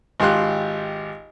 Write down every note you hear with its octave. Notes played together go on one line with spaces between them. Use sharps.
G#1 F4 G4 C6 F#6